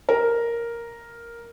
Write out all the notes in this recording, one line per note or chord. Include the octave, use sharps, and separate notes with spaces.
A#4